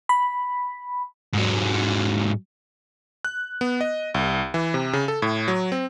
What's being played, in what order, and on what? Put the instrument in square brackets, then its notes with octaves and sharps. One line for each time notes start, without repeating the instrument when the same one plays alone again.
[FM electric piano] B5
[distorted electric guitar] G#2 F#3
[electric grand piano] F#6
B3
D#5
C2
E3
C3
C#3
A4
A2
F#3
C4